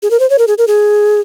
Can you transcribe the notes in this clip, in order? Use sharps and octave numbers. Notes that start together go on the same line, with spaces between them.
G#4
A#4
C5
C#5
A#4
G#4
A#4
G#4